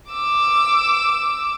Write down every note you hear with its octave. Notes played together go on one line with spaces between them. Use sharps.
D6 E6